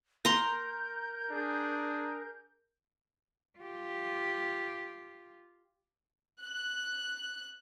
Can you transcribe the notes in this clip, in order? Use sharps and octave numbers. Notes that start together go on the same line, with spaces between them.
A#4 A#5 C6 G6
D4 G#4
F4 G4
F#6